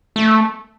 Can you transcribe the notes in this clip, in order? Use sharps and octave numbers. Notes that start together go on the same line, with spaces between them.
A3